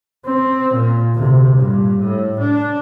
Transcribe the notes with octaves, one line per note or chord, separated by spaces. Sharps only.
C4
A#2
D2 C3
G2 A#2
A2
D4